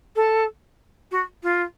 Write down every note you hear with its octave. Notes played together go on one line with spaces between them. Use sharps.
A4
F#4
F4